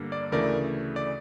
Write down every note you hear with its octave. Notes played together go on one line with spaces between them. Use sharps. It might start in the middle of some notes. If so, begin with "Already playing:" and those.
Already playing: G2 D3 G3 A#3
D5
D2 C#3 E3 A3 A#4 D5
D5